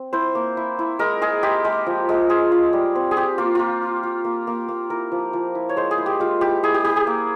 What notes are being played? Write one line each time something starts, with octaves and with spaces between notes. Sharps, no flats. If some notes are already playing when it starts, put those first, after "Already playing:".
Already playing: C4
E4 C5
A#3
E4
E4
G#3 A#4
G#3 G#4
G#3 G4
G#3
F3
G#3
F4 G#4
F4
G3
C4
G#4
F4 G4
A#3 F4
A#3 F4
F4
F4
A#3
A#3
A#3
E4 A#4
F3
F3
E4
C#5
G#3 C5
G#4
E4
G4
G#3 F4
E4 G4
E4 G#4
G4
E4 G4
G#4
A#3